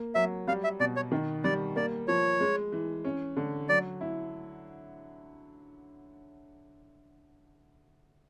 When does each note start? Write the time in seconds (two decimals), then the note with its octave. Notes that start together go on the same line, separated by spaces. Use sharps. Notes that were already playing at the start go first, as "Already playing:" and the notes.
Already playing: A#3
0.15 F#3 E5
0.47 G3 F5
0.64 E5
0.80 B2 D5
0.96 C#5
1.12 D#3
1.44 G3 D5
1.76 A#3 D5
2.08 F3 C#5
2.40 G#3
2.72 E3
3.05 C#4
3.37 D3
3.69 F#3 D5
4.01 E4